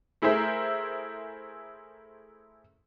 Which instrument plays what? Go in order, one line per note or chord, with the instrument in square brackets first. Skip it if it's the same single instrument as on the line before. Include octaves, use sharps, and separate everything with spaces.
[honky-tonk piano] A3 E4 G#4 A#4 C5 E5